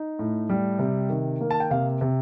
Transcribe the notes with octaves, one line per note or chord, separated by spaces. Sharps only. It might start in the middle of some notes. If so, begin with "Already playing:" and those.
Already playing: D#4
A2
G3
C3
D#3
A#3
A5
G5
C3 F5
C3